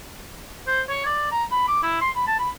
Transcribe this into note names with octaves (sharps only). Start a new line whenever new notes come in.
C5
C#5
D5
A#5
B5
D6
E4
C6
B5
A5
B5